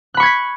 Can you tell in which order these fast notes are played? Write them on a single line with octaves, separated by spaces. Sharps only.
F#6 B5 C#6 G#6 B6